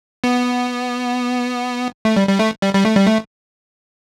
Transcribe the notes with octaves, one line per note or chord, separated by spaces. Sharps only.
B3
A3
G3
G3
A3
G3
G3
A3
G3
A3